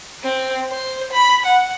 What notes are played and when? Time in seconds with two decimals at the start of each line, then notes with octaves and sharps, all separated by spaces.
0.23 C4
0.70 C5
1.13 B5
1.45 F#5